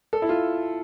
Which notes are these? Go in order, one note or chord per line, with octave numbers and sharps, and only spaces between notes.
A4
E4
F4